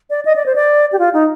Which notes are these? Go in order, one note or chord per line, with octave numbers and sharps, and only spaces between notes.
D5
D#5
D5
C5
D5
G4
F4
D#4